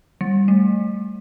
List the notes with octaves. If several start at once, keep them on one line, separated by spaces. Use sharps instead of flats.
G3
A3